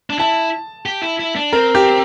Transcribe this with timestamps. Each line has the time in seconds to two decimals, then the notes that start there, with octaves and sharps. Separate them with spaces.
0.10 D4
0.19 E4 A5
0.86 G4
1.02 E4
1.20 E4
1.36 D4
1.53 C4 A#4
1.75 G4